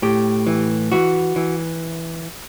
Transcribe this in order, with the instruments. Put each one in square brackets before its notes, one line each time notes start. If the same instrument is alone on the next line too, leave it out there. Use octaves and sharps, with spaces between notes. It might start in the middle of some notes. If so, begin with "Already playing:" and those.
[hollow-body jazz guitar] A2 G4
E3
E3 F#4
E3